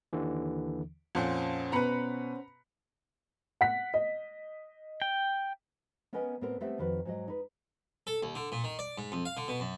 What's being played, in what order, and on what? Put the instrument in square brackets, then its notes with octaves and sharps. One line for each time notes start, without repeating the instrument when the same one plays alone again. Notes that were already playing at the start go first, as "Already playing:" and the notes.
[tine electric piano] D#2 D3 E3
[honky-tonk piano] F2 A#2 [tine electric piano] C#4 C5 F#5
[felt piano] B2 B4 [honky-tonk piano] A#5 B5 C#7
[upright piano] F#5 B6
D#5
[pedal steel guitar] G5
[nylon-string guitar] B3 C#4 A#4 B4 D#5 G#5
A2 B3 C4 A#4 B4
G3 A3 B3 C4 B4 E5
F2 D#3 F#4 B4
G#2 F#3 D#5
D#4 B4
[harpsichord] A4
D#2
D3
A#2
D#3
D5
G#2
F2
F5
D3
B2
F#2